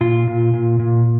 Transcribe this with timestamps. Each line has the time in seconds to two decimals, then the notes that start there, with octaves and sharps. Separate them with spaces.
0.01 A#2 F4
0.27 A#2
0.54 A#2
0.79 A#2